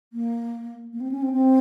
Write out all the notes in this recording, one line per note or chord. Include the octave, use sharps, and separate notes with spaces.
A#3
A#3
C4
C#4
C4
C4